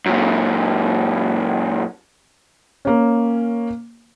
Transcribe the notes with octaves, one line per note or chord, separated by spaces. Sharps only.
F#2 A#2
A#3 C#4